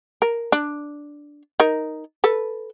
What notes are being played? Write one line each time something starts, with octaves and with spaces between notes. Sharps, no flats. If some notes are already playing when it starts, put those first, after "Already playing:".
A#4
D4
D#4 A#4
A4 B4